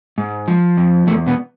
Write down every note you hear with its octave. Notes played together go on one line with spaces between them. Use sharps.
G#2
F3
F2
E2 A3
B2 B3